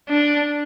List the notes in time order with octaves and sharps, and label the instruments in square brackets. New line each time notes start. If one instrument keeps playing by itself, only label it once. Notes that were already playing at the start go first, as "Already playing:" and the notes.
[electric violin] D4